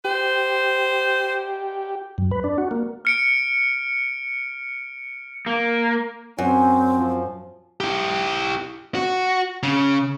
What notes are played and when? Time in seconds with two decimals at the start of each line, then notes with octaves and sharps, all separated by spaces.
0.05 G4 C5
2.18 F#2
2.31 B4
2.44 D4
2.58 F#4
2.71 A#3
3.05 F6 C#7 D7
5.46 A#3
6.38 F#2 C4 C#4
6.99 F3
7.80 E4 G4
8.95 F#4
9.63 C#3